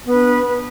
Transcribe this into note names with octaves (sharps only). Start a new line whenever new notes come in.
B3 D4 B4